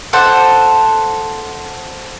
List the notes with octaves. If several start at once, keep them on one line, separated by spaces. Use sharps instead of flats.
A4 C5 F#5